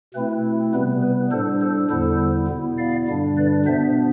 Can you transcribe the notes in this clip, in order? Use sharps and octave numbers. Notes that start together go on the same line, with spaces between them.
B2 A3 C4 E4 B4
C3 G3 B3 B4
B4
A2 G3 D4 A4 C5
A4 C5
E2 D3 G3 B3 E4 A4 C5
B2 B3 E4
D5 F5
G2 D3 G3 D4
B4 D5
B2 B3 D4 C5 E5